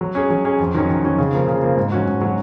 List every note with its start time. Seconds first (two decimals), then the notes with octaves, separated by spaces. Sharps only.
0.01 F#3
0.15 C#4 G#4
0.30 F#3
0.45 C#4 G#4
0.59 F2
0.74 D#3 F#3 C#4
0.89 F2
1.03 D#3 F#3 C#4
1.18 C#3
1.32 F3 A#3
1.48 C#3
1.62 F3 A#3
1.77 G#2
1.92 F#3 C#4 F#4
2.07 G#2
2.21 F#3 C#4 F#4